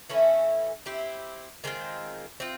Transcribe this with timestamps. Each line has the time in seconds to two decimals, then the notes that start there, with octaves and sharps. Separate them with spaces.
0.10 E3 A3 C#4 E4
0.86 C4 E4 G4
1.64 D#3 G#3 C4 F4
2.40 C4 F4